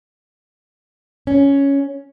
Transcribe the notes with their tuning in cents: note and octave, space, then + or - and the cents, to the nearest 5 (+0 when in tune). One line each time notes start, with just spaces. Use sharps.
C#4 +5